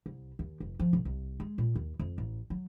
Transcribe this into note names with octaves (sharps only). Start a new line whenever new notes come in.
C2
D#2
F1
F3
B1
C2
G#3
A#2
D#2
F2
A1
F#3